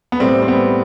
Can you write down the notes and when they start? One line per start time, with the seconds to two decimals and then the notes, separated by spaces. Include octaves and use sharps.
0.12 B3
0.20 A2 G3 C4
0.42 C4
0.48 B3